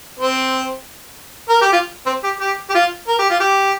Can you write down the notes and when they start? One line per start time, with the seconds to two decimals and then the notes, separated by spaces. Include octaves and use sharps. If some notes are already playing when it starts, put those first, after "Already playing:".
0.19 C4
1.49 A#4
1.61 G4
1.72 F4
2.06 C4
2.23 G4
2.40 G4
2.69 G4
2.74 F4
3.08 A#4
3.19 G4
3.30 F4
3.40 G4